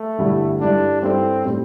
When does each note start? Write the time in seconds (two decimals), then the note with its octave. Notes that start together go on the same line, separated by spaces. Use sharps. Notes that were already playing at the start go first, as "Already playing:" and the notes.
Already playing: A3
0.18 A1 G2 D3 G3 E4
0.60 G2 G3 D4 E4 A4
1.02 G2 G3 C4 E4 A4
1.44 A2 G3 C4